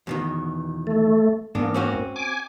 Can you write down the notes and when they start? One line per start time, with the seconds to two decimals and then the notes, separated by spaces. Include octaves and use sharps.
0.07 E2 B2 D#3
0.87 A3
1.55 E2 G#2 A#3 B3 D4
1.74 C4 C#4 F#4
2.16 G#5 D6